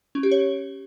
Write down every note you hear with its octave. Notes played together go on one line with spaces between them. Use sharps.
C#4
G4
C#5